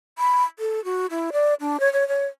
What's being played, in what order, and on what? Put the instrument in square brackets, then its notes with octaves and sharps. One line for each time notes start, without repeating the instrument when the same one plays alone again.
[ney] B5
A4
F#4
E4
D5
D4
C#5
C#5
C#5